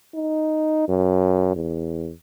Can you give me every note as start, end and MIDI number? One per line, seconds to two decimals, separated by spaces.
0.15 0.86 63
0.88 1.53 42
1.55 2.12 40